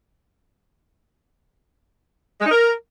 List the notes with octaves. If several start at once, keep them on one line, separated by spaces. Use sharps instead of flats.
G#3
D#4
A#4